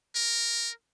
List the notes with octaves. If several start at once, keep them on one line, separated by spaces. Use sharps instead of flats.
A#4